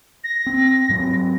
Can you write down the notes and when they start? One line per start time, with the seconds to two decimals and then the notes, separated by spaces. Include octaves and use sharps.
0.23 A#6
0.46 C4
0.89 G#2 F#3 C4